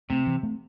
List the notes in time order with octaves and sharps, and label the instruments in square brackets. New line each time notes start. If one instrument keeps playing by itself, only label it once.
[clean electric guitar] C3 [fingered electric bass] A3 C4
[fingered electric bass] E3
A3 C4